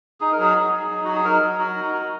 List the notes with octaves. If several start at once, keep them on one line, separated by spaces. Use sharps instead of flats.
D#4 G#4
A#4
F#3 G#4
D#4
F#3
D#4
F#3 F#4
G#4
D#4 A#4
F#3
F#4
D#4
F#4